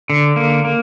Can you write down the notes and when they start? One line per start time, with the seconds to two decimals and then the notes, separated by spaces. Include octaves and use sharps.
0.10 D3
0.36 A#3
0.64 A#3